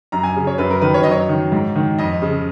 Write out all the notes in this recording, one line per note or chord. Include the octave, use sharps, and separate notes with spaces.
F#2 A#5
G#5
C#3
C#5
F#2 B4
A#4
D#3 B4
C#5
F#2 D#5
C#5
D#3
G#2
D#3
F2 D#5
C#3